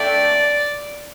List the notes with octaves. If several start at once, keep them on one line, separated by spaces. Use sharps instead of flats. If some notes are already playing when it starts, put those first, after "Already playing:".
Already playing: A3 D4 A4 D5 E5 G5